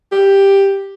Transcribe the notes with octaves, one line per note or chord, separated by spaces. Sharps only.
G4